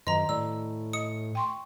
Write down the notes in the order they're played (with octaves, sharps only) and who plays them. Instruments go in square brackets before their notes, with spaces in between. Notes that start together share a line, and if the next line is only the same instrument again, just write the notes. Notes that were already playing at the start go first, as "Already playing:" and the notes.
[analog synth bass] F#2 [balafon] D#3 [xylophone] D#5 A#5
[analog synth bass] A2 [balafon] D5 [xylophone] E6
[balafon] D#5 [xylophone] D#6 C#7
[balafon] G5 C6 C#6